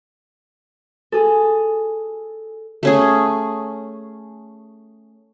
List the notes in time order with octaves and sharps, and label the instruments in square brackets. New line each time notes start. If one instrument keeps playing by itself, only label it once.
[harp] G#4 A4
[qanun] A3 C#4 G#4